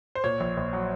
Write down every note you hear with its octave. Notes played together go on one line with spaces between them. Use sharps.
C5
A#2 C#5
A#1
A#1
F#3